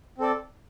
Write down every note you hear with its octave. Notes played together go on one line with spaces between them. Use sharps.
C4 A4 D5